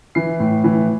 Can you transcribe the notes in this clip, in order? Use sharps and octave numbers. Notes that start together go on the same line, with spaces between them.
E3 C7
A2
E3